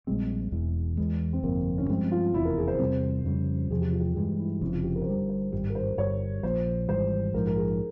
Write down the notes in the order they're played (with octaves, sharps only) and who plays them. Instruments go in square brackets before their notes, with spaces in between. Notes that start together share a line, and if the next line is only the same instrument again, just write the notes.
[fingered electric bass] A#1 A#2 G3 C4 [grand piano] G#3
[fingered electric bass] E1 E2 E3
E2 E3 G#3
[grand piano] C4
[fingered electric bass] G1 F2 C3 [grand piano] A#3
[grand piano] C#4
[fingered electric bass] G2 F3 G#3 [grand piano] C4
[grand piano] F4
[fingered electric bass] F1 E2 E3 [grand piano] E4
[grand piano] A#4
G#4
C5
[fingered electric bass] E2 C3 G3 C4
F2 C#3 G3
[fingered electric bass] E2 C3 F3 [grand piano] G#4
[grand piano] G4
F4
G4
[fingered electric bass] G2 E3 G#3 [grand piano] G4
[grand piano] E4
[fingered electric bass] F1 F2 C#3 [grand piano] E4
[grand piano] F4
G4
A#4
C5
[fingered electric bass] G1 G2 G3 [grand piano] A#4
[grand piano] C5
[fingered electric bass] G#1 G2 G3
[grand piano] A#4
C5
[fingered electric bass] G1 G2 G3 [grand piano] C#5
[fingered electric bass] A#1 A#2 F3 [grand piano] C5
[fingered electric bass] G#1 G#2 E3 G3 [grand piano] C5
[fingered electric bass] A#1 G#2 F3 [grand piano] A#4
[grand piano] A#4
G#4